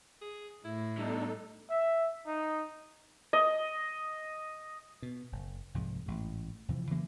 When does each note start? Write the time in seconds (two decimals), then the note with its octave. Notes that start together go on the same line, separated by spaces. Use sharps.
0.22 G#4
0.65 A2 E4
0.98 B2 G3 D4 D#4 A4
1.70 E5
2.27 D#4
3.33 D#5
5.02 B2
5.32 F#1
5.74 C2 F2 G#2
6.06 A1 G#2
6.68 F2 C3 E3 F3
6.90 C#3 E3 F#3 A#3